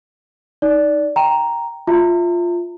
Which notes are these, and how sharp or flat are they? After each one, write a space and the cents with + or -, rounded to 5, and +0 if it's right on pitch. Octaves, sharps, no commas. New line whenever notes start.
D#4 +0 D5 -10
G5 +0 A#5 +0
F4 +0 E5 +0 A#5 -40